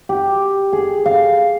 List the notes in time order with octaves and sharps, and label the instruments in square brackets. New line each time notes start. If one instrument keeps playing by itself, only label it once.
[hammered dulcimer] G4
G#4
F5